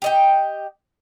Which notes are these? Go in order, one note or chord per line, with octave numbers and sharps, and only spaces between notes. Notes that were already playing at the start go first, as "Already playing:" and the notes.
G4 D#5 G5